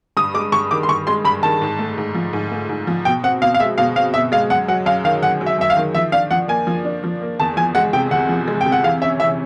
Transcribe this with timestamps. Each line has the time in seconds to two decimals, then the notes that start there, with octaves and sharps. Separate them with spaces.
0.17 G2 D#6
0.34 G#3 D6
0.52 G2 C#6
0.71 D#3 D6
0.83 C6
0.89 G2 C#6
1.07 G#3 C6
1.25 G2 B5
1.43 D#3 A5
1.62 G#2
1.79 A3
1.98 G#2
2.15 F3
2.33 G#2
2.52 A3
2.69 G#2
2.87 F3
3.05 B2 G5
3.23 C4 F#5
3.42 B2 F5
3.54 F5
3.60 G#3 E5
3.78 B2 F5
3.96 C4 F5
4.14 B2 E5
4.32 G#3 F5
4.50 F#2 F#5
4.68 F#3 F#5
4.86 F#2 F5
5.04 D#3 F5
5.22 F#2 F#5
5.41 F#3
5.46 E5
5.59 F#2 E5
5.70 F5
5.77 D#3
5.95 F3 E5
6.12 D4 F5
6.31 F3 F#5
6.48 A#3 G#5
6.67 F3
6.85 D4
7.04 F3
7.22 A#3
7.40 E2 A5
7.57 F3 G#5
7.75 G#3 F#5
7.93 C3 G5
8.11 E2 F#5
8.29 F3
8.48 G#3
8.61 G5
8.66 C3
8.72 F#5
8.83 E3 F5
9.02 C#4 E5
9.20 E3 E5